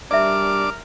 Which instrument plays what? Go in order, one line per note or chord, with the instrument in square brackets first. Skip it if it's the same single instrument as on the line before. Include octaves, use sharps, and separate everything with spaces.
[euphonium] G3 [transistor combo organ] D4 D6 [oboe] A#4 [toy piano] D5 E5